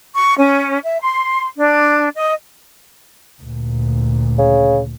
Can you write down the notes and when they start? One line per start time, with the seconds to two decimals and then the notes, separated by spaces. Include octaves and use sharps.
0.14 C#6
0.37 C#4
0.83 E5
1.02 C6
1.57 D4
2.15 D#5
3.42 D2 A#2
4.38 C#3